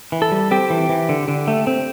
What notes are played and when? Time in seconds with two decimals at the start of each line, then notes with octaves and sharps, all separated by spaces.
0.12 E3
0.22 A4
0.32 G3
0.51 C4 G4
0.70 E3
0.89 E3
1.09 D3
1.28 D3
1.48 A3
1.67 C4